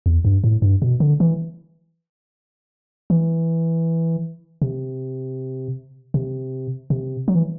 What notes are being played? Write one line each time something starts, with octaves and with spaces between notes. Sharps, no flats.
E2
G2
A2
G2
B2
D3
E3
E3
C3
C3
C3
F#3
E3